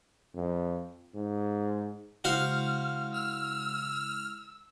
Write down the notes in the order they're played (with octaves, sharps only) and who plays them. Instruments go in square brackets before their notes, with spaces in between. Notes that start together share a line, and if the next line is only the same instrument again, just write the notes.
[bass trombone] F2
G#2
[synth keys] C#3 G#3 E4 [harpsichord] F#4 C5 F5 [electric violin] F6
[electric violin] E6 [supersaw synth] F6